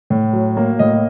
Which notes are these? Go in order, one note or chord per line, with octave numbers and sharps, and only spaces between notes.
A2
F#3
A#3
A2 D#5